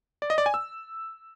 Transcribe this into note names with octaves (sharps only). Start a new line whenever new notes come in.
D5
D#5
D5
G#5
E6